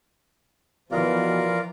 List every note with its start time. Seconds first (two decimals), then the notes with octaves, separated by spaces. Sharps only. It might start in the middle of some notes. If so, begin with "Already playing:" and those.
0.91 B2 E3 F3 F4 A#4 D5